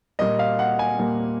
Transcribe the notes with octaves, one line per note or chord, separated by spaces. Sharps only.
A#2 G3 A#3 D#5
F5
F#5
G#5
A#2 G3 A#3